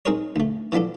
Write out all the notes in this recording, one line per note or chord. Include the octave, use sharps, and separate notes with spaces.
C4 D#4 G#4 A#4 C5 C#5
D2 A3
E3 F3 B3 D4 A4